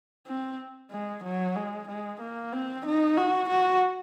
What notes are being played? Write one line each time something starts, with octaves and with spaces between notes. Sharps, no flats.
C4
G#3
F#3
G#3
G#3
A#3
C4
D#4
F#4
F#4